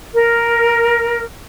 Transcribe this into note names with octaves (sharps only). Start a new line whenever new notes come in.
A#4